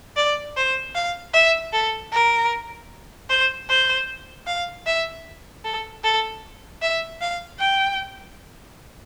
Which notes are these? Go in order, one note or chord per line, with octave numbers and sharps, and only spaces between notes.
D5
C5
F5
E5
A4
A#4
C5
C5
F5
E5
A4
A4
E5
F5
G5